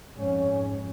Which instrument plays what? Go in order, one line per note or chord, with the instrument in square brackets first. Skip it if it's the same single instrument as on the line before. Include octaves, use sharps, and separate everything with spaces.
[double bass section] F2 G#2 [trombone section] C#4